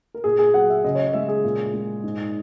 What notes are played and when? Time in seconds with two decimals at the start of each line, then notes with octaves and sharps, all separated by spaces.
0.14 A#4
0.24 A#2 G#4
0.39 G#4
0.54 F#3 F#5
0.70 E5
0.84 C#3 D#5
0.95 C#5
0.99 D#5
1.14 G#3 E5
1.29 G#4
1.44 A#2
1.74 G#3
2.04 G#2